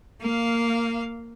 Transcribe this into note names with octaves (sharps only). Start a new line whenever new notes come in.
A#3 F5